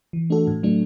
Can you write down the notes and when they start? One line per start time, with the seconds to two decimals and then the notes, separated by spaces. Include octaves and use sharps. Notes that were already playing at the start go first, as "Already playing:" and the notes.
0.13 E3
0.30 A3 D4 F#4 A4
0.47 A2
0.63 F#3 A3 D4